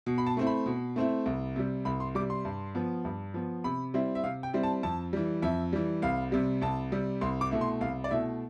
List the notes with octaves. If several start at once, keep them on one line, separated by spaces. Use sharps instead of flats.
B2
B5
A5
A3 C4 E4
B5
B2
A3 C4 E4
C2
C3 G3
C2 B5
C6
C3 G3 D6
C6
G2
F3 B3
G2
F3 B3
C3 B5
G3 C4 E4
E5
C3 F5
G5
G3 C4 E4
A5
F2 A5
E3 G3
F2 E5
E3 G3
C2 F5
C3 G3
C2 A5
C3 G3
C2 C6
D6
B2 A3 E4
C6
C2 F5
D5
B2 A3 E4 E5